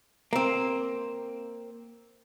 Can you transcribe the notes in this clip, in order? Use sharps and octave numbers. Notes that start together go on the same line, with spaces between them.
A#3 C4